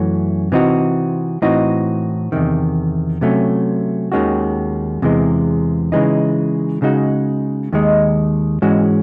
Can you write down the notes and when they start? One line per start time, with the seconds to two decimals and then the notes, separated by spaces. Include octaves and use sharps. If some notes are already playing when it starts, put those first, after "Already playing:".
Already playing: F#2 E3 A3 C#4 F#4
0.52 C3 E3 C4 D#4 F#4
1.42 A2 E3 C4 D#4 F#4
2.32 E2 C3 D#3
3.21 C3 F#3 A3 C#4
4.12 D#2 D#3 G#3 C#4 F#4
5.02 E2 C3 E3 G#3
5.92 C#3 E3 G#3 D#4
6.82 C#3 G#3 D#4 F#4
7.73 D#2 D#3 G#3 D#4
8.62 G#2 E3 G#3 C#4 F#4